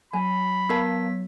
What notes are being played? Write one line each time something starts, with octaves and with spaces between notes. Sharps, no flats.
F#3 G#5 B5
B3 A#4 F5 A5 B6